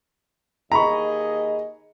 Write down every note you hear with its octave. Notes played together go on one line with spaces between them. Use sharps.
D#2 G#4 D#5 A#5 B5 C#6